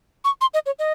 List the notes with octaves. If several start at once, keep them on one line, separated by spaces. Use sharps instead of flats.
C#6
C6
D#5
C#5
D#5